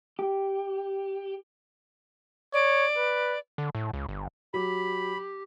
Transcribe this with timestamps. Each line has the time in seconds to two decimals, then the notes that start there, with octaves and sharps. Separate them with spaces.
0.19 G4
2.54 C#5 D5
2.97 B4
3.58 D3
3.75 A2
3.94 C#2
4.09 G1
4.54 F#3 G4 B5